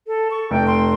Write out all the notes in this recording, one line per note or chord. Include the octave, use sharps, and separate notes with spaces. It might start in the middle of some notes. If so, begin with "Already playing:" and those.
A4
C#6
F1 G5
C6